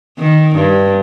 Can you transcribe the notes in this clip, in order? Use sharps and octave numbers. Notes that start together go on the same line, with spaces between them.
D#3
G2